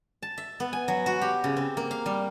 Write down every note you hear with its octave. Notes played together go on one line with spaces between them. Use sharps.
A5
E5
B3
G#5
F#3
F#4
G4
C#3
C4
A#3
F5
G3